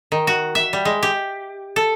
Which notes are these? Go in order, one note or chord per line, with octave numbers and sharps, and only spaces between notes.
D#3
F#4
E5
G3
G#3
G4
A4